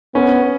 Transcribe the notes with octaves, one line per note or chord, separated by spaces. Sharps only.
B3 C#4